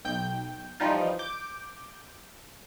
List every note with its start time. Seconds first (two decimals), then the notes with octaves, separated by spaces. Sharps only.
0.05 B1 G5 G6
0.80 E3 F3 G3 D#4 F4
1.19 D6 G6